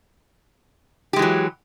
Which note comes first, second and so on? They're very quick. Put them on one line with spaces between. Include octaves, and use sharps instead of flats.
G4 G#3 E3 F#3